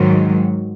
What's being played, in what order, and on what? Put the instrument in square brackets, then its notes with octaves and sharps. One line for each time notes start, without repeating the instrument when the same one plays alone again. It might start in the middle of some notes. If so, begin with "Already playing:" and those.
Already playing: [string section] G#2 D#3 F#3